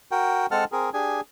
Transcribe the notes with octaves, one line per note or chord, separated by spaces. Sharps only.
F#4 A#4 G5
G#3 C4 A4 F#5 A5 F6
C4 G#4 A#4
D4 G4 G#4 G#5